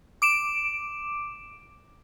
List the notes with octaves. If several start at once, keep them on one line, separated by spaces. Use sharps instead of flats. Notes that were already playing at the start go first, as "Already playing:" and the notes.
D6 D7 E7